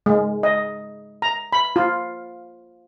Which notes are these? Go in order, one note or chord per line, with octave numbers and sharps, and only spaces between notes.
G#3
D#5
A#5
B5
F4